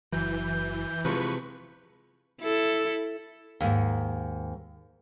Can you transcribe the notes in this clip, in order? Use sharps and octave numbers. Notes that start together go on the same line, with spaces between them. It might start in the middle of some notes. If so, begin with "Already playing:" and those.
F#1 E3 F#3 G6
C3 E3 F3 G#3 B4 C#6
E4 A4
D#2 G#2